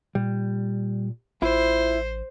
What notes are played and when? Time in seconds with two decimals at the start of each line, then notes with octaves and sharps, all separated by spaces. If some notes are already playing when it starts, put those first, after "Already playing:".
0.15 A#2 G3
1.42 A1 E4 F4 C5